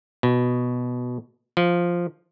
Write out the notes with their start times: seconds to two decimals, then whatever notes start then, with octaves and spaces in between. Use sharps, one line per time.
0.23 B2
1.57 F3